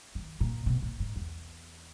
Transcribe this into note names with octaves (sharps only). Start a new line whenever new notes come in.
D#3
A#2
B2
A#2
G#2
E2